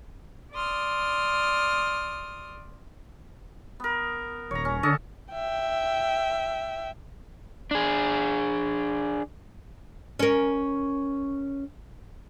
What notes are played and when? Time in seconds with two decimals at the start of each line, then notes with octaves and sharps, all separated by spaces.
0.53 D5 C6 D#6 F6
3.80 B3 A#4
4.51 D#1 C#5 A#5
4.65 C#4
4.83 D3 C#4 A4 D#5
5.34 E5 G5
7.71 D4 G#4
10.19 C#4 A#4